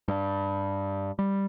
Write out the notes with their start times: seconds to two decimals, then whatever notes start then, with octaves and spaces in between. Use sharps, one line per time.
0.08 G2
1.19 G3